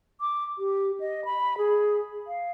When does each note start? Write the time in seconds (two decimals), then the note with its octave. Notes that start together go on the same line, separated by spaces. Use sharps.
0.21 D6
0.59 G4
1.00 D#5
1.25 B5
1.58 G#4
2.27 F5